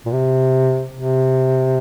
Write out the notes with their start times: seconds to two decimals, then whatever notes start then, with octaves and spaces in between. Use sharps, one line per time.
0.06 A#2
0.13 C3
0.96 C3